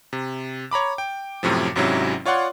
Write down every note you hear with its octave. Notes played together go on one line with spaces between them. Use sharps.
C3
C#5 A#5 B5 D6
G5
F#2 A2 C3 F3
G#1 G#2 C3 F#3 C#4 E4
F4 C#5 D5 F#5 C6